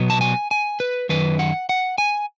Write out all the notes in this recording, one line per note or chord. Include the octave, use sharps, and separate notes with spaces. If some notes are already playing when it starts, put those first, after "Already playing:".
Already playing: B2 F#3 B3
A5
G#5
G#5
B4
F#2 D#3 B4
F#5
F#5
G#5